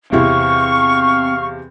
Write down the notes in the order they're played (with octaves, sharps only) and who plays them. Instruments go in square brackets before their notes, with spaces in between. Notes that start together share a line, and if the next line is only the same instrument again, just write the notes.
[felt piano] E2 C3 E4 [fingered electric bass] C4 [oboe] F5 [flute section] C#6